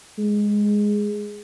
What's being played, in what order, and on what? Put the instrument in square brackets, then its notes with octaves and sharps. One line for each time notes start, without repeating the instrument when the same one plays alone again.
[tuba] G#3